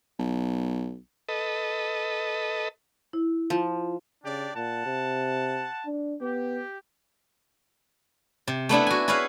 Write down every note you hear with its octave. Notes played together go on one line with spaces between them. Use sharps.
B1
A4 B4 D#5
E4
F3
C#3 D4 G4 D5
A#2 F#5 A5
C3
D4
B3 G4
C3
A3 B3 D4 E4
F#4 G#5
E4 G#4 B4 C#5 F5